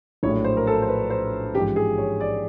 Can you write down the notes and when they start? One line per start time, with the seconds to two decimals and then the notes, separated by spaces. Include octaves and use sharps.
0.23 A#1 A2 F#3 A3 C#5
0.44 C5
0.57 A#4
0.67 A4
0.82 C5
0.88 B4
1.10 C5
1.54 A1 G#2 F3 G4
1.76 G#4
1.98 C#5
2.20 D5